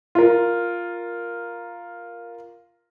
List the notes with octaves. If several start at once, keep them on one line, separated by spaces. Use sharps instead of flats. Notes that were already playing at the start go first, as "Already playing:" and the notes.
F4 A#4